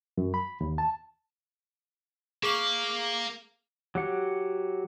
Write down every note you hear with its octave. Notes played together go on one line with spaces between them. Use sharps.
F#2
B5
D#2
A5
A#3 G#4 F5 D6 F#7
F#3 G4 F#5